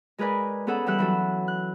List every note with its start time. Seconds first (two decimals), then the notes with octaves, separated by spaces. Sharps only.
0.18 G#3 G#4 A#4 B4 D5 G#5
0.67 B3 C#4 G#4 A4 F#5 A5
0.86 E3 G3 G4 E5 F#5 F#6
0.99 E3 F#3 A4
1.48 F#6